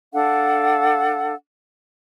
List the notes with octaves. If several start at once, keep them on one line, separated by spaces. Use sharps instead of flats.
D4 A4 F5 F#5